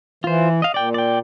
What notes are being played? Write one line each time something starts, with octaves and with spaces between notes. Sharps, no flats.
E3 F4 C5
D#5 F5
A#2 D5 G5
D5 G5